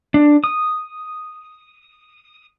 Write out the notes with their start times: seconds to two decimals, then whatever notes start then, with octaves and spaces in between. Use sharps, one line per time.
0.14 D4
0.44 D#6